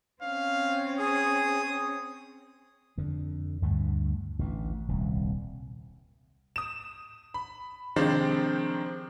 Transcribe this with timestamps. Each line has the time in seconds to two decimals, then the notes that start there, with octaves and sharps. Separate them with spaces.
0.22 C4 C#4 F5
0.99 G#4 D#6
2.98 F2 D3
3.62 D2 G2 D3 A3
4.39 A1 D2 E3
4.88 D#1 C2
6.56 D#6 E7
7.34 B5
7.96 C3 D#3 F3 G#3 C4 D4